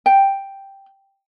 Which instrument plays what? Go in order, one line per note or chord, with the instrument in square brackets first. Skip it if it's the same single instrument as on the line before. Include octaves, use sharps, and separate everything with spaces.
[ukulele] G5